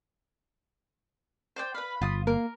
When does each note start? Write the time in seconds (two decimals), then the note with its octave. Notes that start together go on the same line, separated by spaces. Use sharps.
1.56 C5 D5 G5
1.74 B4 F5 B5
2.02 G1 F4 D#6
2.27 A#3 A#4